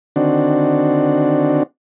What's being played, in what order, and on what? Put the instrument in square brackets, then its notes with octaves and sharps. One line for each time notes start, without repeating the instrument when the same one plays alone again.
[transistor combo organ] D3 D#3 C4 D4 F#4